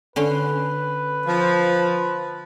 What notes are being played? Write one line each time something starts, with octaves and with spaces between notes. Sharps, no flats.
D3 C#4 B4 C6
F3